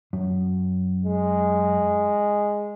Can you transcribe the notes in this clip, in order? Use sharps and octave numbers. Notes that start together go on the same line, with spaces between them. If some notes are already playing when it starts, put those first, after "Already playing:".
F#2
G#3